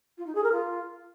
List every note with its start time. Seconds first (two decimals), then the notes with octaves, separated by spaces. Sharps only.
0.18 F4
0.26 D#4
0.35 G#4
0.44 A#4
0.52 F4